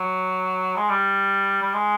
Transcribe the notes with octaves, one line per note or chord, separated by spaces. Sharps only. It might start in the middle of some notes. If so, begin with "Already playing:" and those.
Already playing: F#3
G#3
G3
G3
G#3